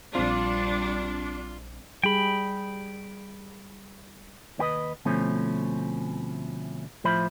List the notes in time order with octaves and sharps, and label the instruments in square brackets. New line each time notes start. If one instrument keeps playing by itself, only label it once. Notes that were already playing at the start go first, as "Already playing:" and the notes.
[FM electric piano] A#1 C4 [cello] G3 [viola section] D4 [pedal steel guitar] F4
[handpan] G3 G#4 [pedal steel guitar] G5 B5
[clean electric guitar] D#2 C#4 F#4 B4 D#5
D2 B2 F3 A3 C4 C#4
A2 F3 F4 C5 E5 B5